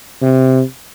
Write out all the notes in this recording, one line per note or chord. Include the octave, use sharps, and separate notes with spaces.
C3